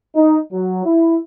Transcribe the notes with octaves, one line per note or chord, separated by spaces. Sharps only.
D#4
F#3
E4